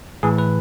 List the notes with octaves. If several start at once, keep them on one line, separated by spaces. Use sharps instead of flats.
A2 E3 G#4
B4